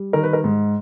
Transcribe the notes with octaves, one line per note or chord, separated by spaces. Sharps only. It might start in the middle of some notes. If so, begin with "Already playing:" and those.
Already playing: G3
D#3 A#4
B4
A#4
G#2